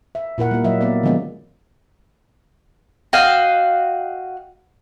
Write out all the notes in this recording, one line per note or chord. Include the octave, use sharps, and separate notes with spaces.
E5
A#2 E4 A#4 F#5
G3 A#3
F#3 D#5 E5
A#3 B3 A#4 D5
D3 D#3 F3 G#3 B3 C#4
F#4 D#5 F5 G5